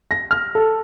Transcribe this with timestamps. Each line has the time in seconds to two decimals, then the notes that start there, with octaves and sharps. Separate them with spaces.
0.11 A#6
0.31 F6
0.55 A4